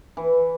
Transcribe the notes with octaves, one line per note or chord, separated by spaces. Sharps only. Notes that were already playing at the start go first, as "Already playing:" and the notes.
E3